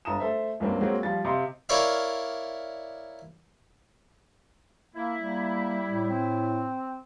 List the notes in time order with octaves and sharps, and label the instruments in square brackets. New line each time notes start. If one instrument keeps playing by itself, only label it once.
[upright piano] G1 A5 A#5 D#6 E7
A3 A4 C5 E5
C#2 G2 F#3 A#3 C4
F#3 G#3 A#3 C4 F#4
F3 G3 F4 A6
C3 D#5 F5 C6
[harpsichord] E4 A#4 C#5 D5 E5 F5
[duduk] A#3 [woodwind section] E4
[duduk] G3 [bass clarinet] A#3
[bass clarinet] A2
[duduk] C4